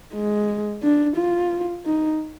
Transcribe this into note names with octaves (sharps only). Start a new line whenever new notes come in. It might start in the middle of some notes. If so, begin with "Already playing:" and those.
G#3
D4
F4
D#4